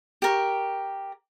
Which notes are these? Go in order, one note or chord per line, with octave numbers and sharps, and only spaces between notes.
G4 A#4 C#6